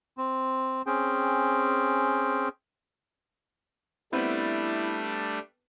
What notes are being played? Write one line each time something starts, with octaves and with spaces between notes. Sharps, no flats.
C4
C4 C#4 G#4 G5
G3 A3 B3 C4 D4 E4 B4